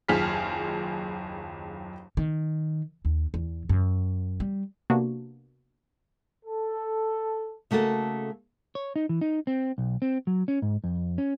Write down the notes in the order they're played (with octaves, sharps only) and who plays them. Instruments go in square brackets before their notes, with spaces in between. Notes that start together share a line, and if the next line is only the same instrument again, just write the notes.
[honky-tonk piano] F#1 D#2 F4 G#4 F6 B6
[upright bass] D#3
D#2
E2
F#2
G3
[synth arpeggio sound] C3 A#3 B3 D4 F#4
[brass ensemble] A4
[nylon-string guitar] C#3 A3 A#3 F#4 A4
[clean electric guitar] C#5
D#4
E3
D#4
C4
B1
C4
F#3
C#4
G#2
F2
C#4